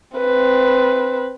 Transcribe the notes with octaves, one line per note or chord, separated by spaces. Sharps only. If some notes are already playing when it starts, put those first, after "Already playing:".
C4 B4